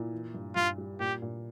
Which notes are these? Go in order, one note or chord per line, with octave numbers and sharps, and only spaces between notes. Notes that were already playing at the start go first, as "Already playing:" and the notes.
Already playing: A#2 E4
E3
G2
G2 F4
G3
A#2 G4
A#2